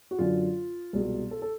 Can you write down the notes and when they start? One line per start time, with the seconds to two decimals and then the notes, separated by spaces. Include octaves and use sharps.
0.11 F#4
0.19 F#2 D3 F#3 F4
0.93 C2 B2 G#3 B3
1.31 A4
1.42 A4